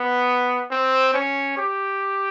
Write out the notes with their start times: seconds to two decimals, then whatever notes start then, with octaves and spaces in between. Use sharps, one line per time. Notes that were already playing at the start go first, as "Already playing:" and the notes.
Already playing: B3
0.71 C4
1.14 C#4
1.57 G4